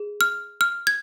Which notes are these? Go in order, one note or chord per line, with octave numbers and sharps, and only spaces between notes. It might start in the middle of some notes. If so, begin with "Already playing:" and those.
Already playing: G#4
F6
F6
G#6